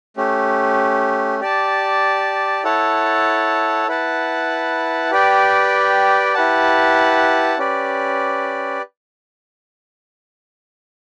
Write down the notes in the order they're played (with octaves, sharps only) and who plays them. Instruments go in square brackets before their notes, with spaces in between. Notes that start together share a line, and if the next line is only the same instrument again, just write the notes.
[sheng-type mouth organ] A3 C#4 G4
G4 D5 A5
E4 A4 C#5 F#5 A5
E4 B4 F#5 A5
G4 B4 D5 G5
E4 G4 B4 F#5 A5
C#4 G4 B4 D5